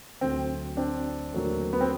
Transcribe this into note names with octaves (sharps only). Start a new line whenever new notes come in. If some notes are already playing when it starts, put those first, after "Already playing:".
D2 D3 F#3 A3 C4
C4 D4
D#2 D3 F#3 A3
B3
C4